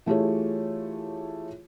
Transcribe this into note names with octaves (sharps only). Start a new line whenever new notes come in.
E3 A3 F4 G4 G#4 C#5